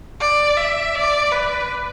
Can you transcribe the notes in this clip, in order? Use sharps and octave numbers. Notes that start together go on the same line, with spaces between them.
D5
E5
D5
B4